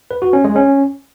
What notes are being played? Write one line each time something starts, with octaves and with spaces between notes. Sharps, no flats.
B4
F#4
C#4
G#3
C#4